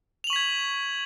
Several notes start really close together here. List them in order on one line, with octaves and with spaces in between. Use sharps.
F7 F#7 C#6 B6 G#6